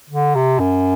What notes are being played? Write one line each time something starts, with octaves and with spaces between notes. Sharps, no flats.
D3
C3
F#2